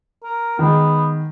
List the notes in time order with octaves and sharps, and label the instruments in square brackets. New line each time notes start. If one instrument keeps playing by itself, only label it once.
[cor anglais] A#4
[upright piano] D#3 G#3 [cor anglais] B3